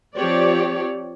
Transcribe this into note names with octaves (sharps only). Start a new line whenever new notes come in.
F3 C4 G4 C#5 D5